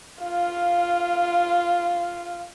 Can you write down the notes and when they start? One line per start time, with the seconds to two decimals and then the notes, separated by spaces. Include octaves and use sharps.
0.23 F4 F5